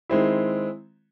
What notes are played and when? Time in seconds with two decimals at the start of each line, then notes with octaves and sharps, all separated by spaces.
0.09 D#3 G#3 C4 E4